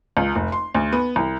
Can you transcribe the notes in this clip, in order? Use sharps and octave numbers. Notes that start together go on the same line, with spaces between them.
C#2
F1
C6
D2
B3
C2